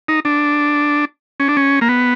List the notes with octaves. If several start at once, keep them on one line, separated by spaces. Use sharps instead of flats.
D#4
D4
C#4
D4
C#4
A#3
B3